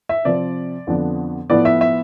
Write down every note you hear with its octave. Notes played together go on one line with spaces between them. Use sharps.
E5
C3 F3 C4 D5
F2 D3 F3 B3 D4
A2 F3 B3 E4 D5
E5
E5